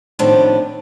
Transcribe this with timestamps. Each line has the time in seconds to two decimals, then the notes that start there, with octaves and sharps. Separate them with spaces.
0.19 A2 D#3 F3 B3 C4 D4